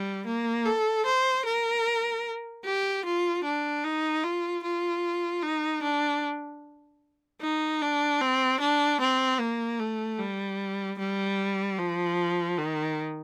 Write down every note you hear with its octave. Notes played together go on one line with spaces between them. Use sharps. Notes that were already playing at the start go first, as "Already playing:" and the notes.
Already playing: G3
A#3
A4
C5
A#4
G4
F4
D4
D#4
F4
F4
D#4
D4
D#4
D4
C4
D4
C4
A#3
A3
G3
G3
F3
D#3